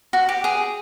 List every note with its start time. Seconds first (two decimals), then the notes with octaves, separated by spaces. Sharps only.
0.13 F#4
0.29 G4
0.44 G#4